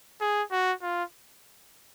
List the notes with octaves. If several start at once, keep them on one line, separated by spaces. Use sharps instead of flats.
G#4
F#4
F4